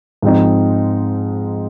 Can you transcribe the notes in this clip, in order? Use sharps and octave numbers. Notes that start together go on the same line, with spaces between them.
G#2 F3 C4 D#4